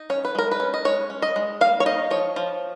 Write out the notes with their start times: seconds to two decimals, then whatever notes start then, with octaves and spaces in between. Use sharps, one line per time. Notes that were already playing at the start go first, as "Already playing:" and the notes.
Already playing: D#4
0.10 C#4 C#5
0.25 B4
0.35 G#3 A#4
0.51 B4
0.60 C#4
0.74 D#5
0.85 G#3 C#5
1.10 C#4
1.22 D#5
1.36 G#3
1.61 A#3 F5
1.80 C#5
1.86 D#4 D#5
2.11 F3 C#5
2.36 F3